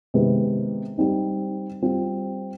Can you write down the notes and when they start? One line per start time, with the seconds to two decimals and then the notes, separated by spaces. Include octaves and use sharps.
0.14 C3 D#3 G#3 B3
0.98 G3 C4 D#4
1.82 G3 C4 F4